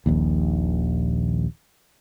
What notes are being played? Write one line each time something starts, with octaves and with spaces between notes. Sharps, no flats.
D#1 A#1 D#2